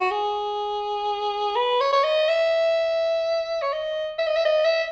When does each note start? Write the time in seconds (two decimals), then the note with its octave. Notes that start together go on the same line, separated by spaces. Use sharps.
0.01 F#4
0.11 G#4
1.56 B4
1.81 C#5
1.93 C#5
2.04 D#5
2.29 E5
3.62 C#5
3.73 D#5
4.18 E5
4.27 D#5
4.36 E5
4.45 D#5
4.65 E5